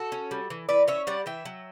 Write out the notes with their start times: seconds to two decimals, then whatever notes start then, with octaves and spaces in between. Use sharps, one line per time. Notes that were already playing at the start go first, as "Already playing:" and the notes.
Already playing: F#4 A4
0.12 C#4
0.31 G3
0.50 E3
0.69 E3 B4 D5
0.88 C#4 C#5 E5
1.07 G3 D5 F#5
1.26 E3 E5 G5
1.45 F#3